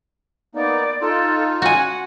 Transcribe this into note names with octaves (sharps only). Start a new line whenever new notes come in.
A#3 B3 D#4 D5
D#4 F4 A4
F#4 F#5 G#5